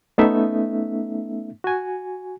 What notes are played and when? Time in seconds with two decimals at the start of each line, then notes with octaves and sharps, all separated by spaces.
0.18 A3 B3 C#4 D#4 A4 E5
1.64 F#4 G#5